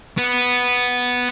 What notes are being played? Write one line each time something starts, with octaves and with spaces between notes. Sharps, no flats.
B3